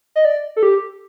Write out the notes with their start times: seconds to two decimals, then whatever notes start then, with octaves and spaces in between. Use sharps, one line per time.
0.16 D#5
0.25 D5
0.56 A4
0.63 G4